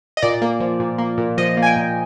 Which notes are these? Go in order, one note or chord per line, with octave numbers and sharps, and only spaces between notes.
D#5
A#2 D5
A#3
F3
A#2
A#3
A#2
F3 D#5
A#3
G#5
G5
A#2